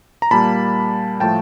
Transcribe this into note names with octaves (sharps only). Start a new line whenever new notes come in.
A#5
A#2 G3 A#3 A5 B5
A2 F3 A3 G5 A5